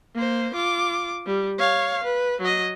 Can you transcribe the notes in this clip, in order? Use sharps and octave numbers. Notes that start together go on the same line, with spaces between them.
A#3 C5
F4 D6
G3
C#5 F5
B4
F#3 D#5